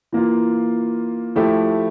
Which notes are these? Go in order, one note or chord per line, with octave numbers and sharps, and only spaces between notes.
E3 A#3 F4
F3 A3 E4 G4